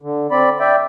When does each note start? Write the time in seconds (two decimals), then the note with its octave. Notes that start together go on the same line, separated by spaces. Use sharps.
0.01 D3
0.31 C4 D5 B5
0.60 D5 E5 G5